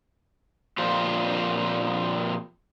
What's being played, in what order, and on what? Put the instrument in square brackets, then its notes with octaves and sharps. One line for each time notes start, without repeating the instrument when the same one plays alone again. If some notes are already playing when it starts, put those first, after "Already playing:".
[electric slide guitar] A#2 F3 C4 F4 G4